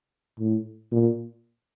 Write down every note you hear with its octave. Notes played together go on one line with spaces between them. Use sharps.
A2
A#2